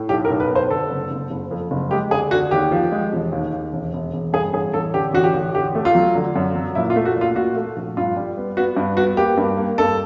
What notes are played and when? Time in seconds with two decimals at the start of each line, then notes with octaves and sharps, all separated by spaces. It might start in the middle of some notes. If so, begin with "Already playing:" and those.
Already playing: A2
0.09 B1 G4
0.25 A#4
0.30 B1
0.40 B4
0.50 B3
0.56 C5
0.70 D3 A4
0.90 F#1
1.11 F#1
1.30 F#1
1.51 F2
1.71 F#1
1.91 G#3 G4
2.11 D3 G#4
2.31 D3 F#4
2.51 D#2 G4
2.72 F3
2.92 G#3
3.13 E1
3.32 D#2
3.53 D#2
3.73 E1
3.93 E1
4.13 E1
4.33 G2 G#4
4.53 A1 G#4
4.74 A1 A4
4.94 D3 G4
5.14 A1 F#4
5.24 G4
5.34 A1
5.54 D3 G4
5.75 A3
5.85 F4
5.95 F#3
6.15 D3
6.36 F#2
6.55 F#3
6.75 A#2 E4
6.90 F4
6.96 A3
7.05 F#4
7.16 A#2
7.21 F4
7.35 A#2 F#4
7.56 A3
7.77 A#1
7.97 G2 F4
8.16 G3
8.37 B3
8.57 B3 F#4
8.77 G2
8.97 B3 F#4
9.17 A#3 G4
9.38 G2
9.57 A#3
9.78 G2 A4